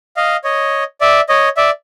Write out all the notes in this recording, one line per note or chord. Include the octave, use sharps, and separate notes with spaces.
D#5 F5
C#5 D#5
D5 E5
C#5 D#5
D5 E5